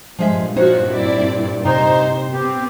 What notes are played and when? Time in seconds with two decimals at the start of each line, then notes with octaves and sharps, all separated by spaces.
0.19 G2 A#2 F3 G#3 E5
0.56 F3 D#4 F#4 C5 C#5
0.87 C4 E4 D5
1.65 C3 D#4 C5
2.33 B3 C4 G4